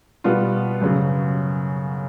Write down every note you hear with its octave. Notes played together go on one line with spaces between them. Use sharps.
B2 G3 B3 F4
F#2 C#3 F#3